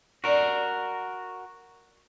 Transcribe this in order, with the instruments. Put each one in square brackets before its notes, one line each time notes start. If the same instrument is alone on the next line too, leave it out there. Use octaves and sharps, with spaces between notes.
[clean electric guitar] F#4 A#4 [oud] D5